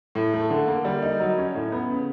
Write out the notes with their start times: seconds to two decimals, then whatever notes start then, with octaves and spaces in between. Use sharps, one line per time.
0.15 A2
0.34 A3
0.50 D3
0.67 A#3
0.85 G3
1.02 D#4
1.19 F#3
1.38 C#4
1.55 A2
1.72 B3
1.90 C#3